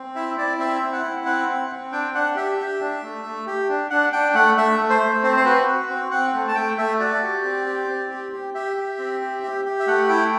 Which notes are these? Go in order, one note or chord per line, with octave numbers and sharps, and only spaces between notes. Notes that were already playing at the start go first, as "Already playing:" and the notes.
Already playing: C4
E4 E5
E4 D5
C4 E5
E4
F#5
E4
C4 F#5
C4
C4
D4 G5
D4 F#5
G4 E5
G4
D4
A3
A3
G4
D4
D4 F#5
D4 G5
A3 F#5
A3 E5
A3
C5
A3
C4 C5
C5
F#4 B4
F#4
C4
C4 F#5
A3
A5
A3 G5
A3 E5
F#4 D5
G4
C4
G4
C4
G4
G4
G4 E5
G4
C4
G4
G4
G4
E5
A3 F#5
E4 G5